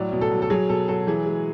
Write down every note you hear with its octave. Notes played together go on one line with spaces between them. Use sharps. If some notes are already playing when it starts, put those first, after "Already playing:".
Already playing: A2 F#3 D5
B2
A4
F#3
A4
F#3 G#4
B2 A4
F#3 A4
E3 G#4
G#3